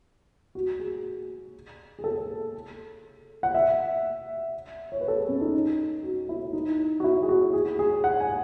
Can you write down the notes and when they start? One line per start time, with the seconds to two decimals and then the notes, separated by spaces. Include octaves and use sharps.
0.55 F#4
0.80 G#4
1.99 G#4
2.04 A4
3.43 F#5
3.55 E5
4.92 C#5
5.01 B4
5.08 A4
5.17 G#4
5.29 C#4
5.41 D#4
6.03 F#4
6.29 E4
6.53 D#4
7.00 F#4
7.04 E4
7.23 G#4
7.29 F#4
7.53 G#4
7.79 G#4
8.04 F#5
8.20 G#5